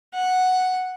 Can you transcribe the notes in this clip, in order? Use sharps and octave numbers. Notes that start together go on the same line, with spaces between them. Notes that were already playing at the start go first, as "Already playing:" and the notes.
F#5